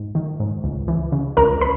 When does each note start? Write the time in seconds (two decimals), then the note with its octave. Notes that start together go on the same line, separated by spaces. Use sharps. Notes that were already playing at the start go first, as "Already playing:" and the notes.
Already playing: G#2
0.15 D#3
0.40 G#2
0.64 C#2
0.88 E3
1.12 C#3
1.37 C#2 A#4 A#5
1.61 B4 B5